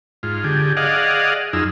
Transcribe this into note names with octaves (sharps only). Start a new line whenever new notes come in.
G#2 F4
D3 G4 G#4
G#4 D5 D#5 F5 F#5
F#2 D#4 F4 G#4 E6